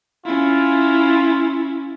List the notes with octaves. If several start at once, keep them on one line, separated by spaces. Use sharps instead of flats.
C#4 E4 F4